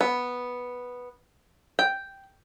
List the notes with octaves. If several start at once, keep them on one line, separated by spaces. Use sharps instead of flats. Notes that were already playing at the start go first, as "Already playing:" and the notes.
B3
G5